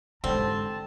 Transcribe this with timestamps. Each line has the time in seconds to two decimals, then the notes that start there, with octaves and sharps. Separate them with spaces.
0.24 G#2 D3 G3 C4 A5